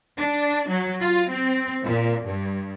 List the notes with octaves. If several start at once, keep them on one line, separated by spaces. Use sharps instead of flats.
D4
F#3
F4
C4
A#2
G2